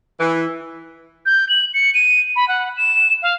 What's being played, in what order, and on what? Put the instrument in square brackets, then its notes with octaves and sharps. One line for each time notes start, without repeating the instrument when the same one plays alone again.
[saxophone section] E3
[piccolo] G6
F#7
C#7
D#7
B5
F#5
E7
F5